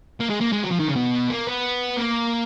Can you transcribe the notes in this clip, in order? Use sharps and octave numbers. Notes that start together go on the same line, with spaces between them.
A#3
G#3
A#3
G#3
F#3
F3
D#3
C#3
B2
A#3
B3
A#3